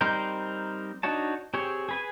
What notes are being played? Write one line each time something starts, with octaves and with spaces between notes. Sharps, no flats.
G3 C4 D#4 A#4 C5
D4 D#4 F#4 C#5 A5
C4 G4 G#4 C#5
G#4 B4 G#5